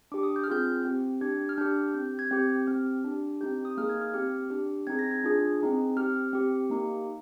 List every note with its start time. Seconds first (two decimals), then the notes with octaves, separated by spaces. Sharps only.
0.12 D4 G4 D6
0.23 D#6
0.36 G6
0.44 F6
0.48 C4 F4 G#4 G6
0.85 C4 G4
1.21 D4 G4 G#6
1.49 F6
1.58 D4 G6
1.61 G4
1.94 C4 G4 G6
2.19 G#6
2.31 C4 G4 G6
2.67 C4 G4 F6
3.04 D4 G4
3.41 C4 D#4 G4 G6
3.65 D#6
3.77 A#3 D#4 G#4 F6
3.89 G#6
4.01 F6
4.14 C4 G4 F6
4.50 D4 G4
4.87 C4 D#4 G#4 G#6
4.99 A#6
5.11 G#6
5.24 D4 F4 G#4
5.60 C4 D#4 G#4
5.97 C4 G4 F6
6.33 C4 G4
6.70 A#3 D#4 G4